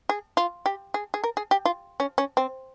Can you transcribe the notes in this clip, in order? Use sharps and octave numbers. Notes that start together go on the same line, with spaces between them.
G#4
F4
G4
G#4
G#4
A#4
G#4
G4
F4
C#4
C#4
C4